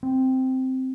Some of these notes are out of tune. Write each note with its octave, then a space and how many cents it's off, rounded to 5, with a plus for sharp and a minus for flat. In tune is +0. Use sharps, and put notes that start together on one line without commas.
C4 -5